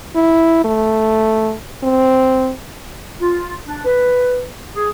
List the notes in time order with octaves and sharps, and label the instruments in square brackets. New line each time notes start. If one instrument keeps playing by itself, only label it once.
[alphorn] E4
A3
C4
[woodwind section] F4
D4
B4
G#4